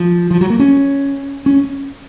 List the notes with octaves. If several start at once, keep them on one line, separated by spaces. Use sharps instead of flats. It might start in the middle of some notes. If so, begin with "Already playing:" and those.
Already playing: F3
F3
F#3
A#3
C#4
C#4